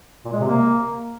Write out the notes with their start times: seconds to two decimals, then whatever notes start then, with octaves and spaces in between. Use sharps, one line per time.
0.25 A#2
0.32 G#3
0.40 C3
0.48 A#3